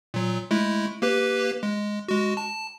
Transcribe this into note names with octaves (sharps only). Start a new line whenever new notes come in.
A#2 F#3
G#3 A3 E4
A#3 G4 B4
G#3
G#3 F#4
A5